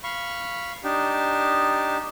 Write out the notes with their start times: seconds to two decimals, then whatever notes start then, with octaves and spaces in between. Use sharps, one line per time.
0.03 F5 B5 C#6
0.84 D4 D#4 G4